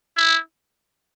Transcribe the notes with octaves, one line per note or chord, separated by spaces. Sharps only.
E4